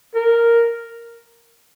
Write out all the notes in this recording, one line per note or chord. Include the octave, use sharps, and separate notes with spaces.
A#4